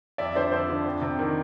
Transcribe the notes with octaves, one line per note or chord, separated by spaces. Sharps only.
F2 D5 E5
D3 C5 D5
F2 C5 D5
D3
F2
C3
D#3